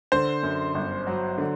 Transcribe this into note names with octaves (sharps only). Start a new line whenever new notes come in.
D3 C5
F#2
G1
F#3
D3